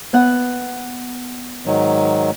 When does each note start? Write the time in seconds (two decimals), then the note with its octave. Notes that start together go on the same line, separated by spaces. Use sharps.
0.13 B3 F#5
1.66 G#2 D#3 F#3